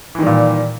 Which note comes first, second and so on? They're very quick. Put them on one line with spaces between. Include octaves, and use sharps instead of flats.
E3 D#3 G3 A#2